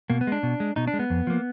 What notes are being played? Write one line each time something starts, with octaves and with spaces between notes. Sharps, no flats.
B2 A#3
B3
G#3 D4
B2
G#3
B2 D#4
D4
G#3
B3
F2
F3 A#3